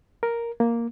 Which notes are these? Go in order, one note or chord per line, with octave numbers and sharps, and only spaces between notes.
A#4
A#3